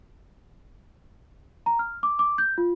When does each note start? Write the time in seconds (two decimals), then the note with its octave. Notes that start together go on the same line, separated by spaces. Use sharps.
1.66 A#5
1.79 F6
2.03 D6
2.19 D6
2.38 G6
2.58 F4